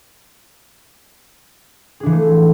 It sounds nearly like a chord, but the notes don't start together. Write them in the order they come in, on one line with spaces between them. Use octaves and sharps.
G#4 D4 E3 F3 A3